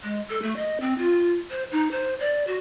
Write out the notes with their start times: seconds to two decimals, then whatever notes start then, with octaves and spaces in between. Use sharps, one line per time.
0.03 G#3
0.30 A4
0.42 A3
0.57 D#5
0.80 C4
0.98 F4
1.51 C5
1.72 D#4
1.91 C5
2.20 D5
2.47 F#4